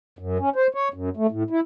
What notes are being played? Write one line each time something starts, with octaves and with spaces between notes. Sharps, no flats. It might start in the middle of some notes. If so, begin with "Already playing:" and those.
F#2
C#4
C5
C#5
F#2
A3
A2
E4